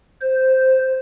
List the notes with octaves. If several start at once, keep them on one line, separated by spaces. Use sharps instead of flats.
C5